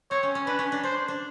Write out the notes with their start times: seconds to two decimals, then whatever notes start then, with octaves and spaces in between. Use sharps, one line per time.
0.11 C4 C#5
0.23 C#4
0.35 C#4
0.46 D4 B4
0.59 C#4
0.72 D4
0.83 D4 C5
1.08 D4